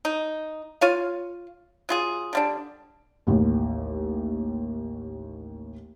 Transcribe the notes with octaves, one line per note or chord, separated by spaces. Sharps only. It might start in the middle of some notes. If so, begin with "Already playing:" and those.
D#4
F4 C#5 F5
F#3 F4 G#4
D3 G3 D4
A1 D#2